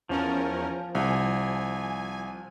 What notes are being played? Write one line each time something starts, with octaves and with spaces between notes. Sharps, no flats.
E2 F3 C#4 A#4
C2 G#5